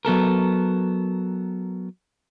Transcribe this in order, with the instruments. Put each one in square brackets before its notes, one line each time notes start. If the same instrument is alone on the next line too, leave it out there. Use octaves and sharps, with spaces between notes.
[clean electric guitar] F#3 B3 A4 A#4